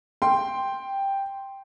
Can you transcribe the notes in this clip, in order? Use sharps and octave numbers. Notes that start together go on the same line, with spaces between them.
G5 C6